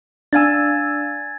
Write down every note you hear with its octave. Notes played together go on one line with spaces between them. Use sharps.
D4 F5 G#5 E6 G#6 A6